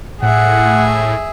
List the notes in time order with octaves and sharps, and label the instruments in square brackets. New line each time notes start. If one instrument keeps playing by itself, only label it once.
[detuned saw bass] A2 [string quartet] G#4 E5 [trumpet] F#5